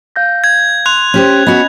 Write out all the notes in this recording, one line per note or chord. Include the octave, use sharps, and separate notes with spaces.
F5 G6 A#6
G#6
C6 F#6 F7
C#4 G4 C5
B3 C#4 F#4 D#5 B5